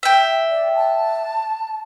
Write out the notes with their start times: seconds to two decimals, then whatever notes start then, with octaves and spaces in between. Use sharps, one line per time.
0.03 E5 G5
0.50 D5
0.75 A5